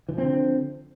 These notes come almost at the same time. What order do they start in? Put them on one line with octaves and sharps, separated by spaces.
E3 F3 C4 D3